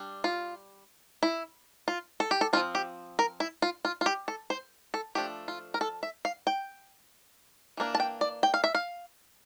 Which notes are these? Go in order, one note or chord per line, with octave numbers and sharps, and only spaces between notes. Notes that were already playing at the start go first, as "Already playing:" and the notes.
Already playing: G3 D4
F4
E4
F4
A4
G4
A4
F3 A3 C4 F4
G4
A#4
E4
F4
F4
F4
G4
A4
C5
A4
F3 A3 D4 G4
F4
A#4
A4
E5
F5
G5
E3 A#3 D4
A5
G5
D5
G5
F5
E5
F5